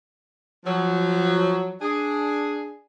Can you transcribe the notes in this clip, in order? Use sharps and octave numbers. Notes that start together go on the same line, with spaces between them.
F3 F#3
D4 G#4